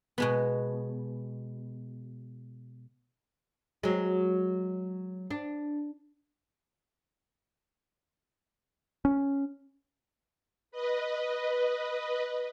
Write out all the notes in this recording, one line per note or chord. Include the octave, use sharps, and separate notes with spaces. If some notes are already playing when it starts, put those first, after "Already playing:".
B2 G#3 B3
F#3 G#3
D4
C#4
B4 D#5